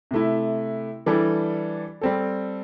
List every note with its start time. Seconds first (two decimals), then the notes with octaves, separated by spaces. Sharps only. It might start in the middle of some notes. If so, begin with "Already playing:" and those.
0.11 C3 A3 E4
1.06 E3 G3 D4 A4
2.01 G3 C4 A4